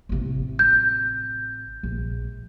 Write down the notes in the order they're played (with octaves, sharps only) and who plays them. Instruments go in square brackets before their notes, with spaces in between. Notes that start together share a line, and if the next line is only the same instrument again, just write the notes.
[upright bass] A1 C3
[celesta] G6
[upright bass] A#1